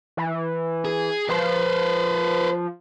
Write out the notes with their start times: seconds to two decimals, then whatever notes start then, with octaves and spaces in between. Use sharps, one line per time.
0.17 E3
0.85 G#4
1.29 F3 B4 C5